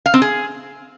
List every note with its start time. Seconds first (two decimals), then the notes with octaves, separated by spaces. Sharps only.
0.06 F5
0.14 C4
0.22 G#4